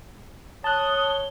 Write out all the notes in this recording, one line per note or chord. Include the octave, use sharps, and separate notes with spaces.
C#5 A5 D#6 F#6 G7